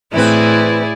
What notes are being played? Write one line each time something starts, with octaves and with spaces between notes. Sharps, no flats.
A2 E3 C4 E4 G#4 B4 D5